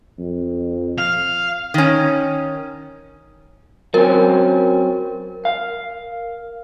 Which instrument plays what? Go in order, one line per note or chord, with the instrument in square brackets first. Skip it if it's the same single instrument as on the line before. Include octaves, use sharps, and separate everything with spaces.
[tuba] F2
[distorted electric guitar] F5
[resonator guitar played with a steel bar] D#3 C#4
[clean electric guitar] F#3 C4 C#4 [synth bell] A#4
[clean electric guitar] F5